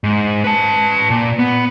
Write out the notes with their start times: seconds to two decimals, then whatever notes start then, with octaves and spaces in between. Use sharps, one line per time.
0.04 G#2
0.44 B4 A5
1.10 A#2
1.39 B3